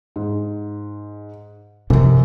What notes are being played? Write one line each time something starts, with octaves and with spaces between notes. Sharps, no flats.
G#2
F#2 C3 F3